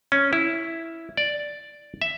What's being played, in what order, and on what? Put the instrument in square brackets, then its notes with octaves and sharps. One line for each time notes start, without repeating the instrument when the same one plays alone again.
[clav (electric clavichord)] C#4
E4
D5
E5